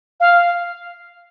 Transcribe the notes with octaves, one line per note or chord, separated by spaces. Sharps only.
F5